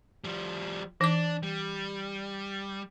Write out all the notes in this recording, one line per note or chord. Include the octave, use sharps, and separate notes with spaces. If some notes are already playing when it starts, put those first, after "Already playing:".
F3 G3
E3 D4 D6
G3